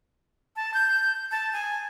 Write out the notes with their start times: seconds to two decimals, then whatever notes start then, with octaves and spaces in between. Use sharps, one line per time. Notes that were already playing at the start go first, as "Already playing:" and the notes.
0.56 A5
0.74 G6
1.31 A5
1.53 G#5